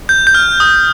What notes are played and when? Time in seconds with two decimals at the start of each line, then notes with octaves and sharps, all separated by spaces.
0.09 G6
0.27 G6
0.35 F6
0.60 D#6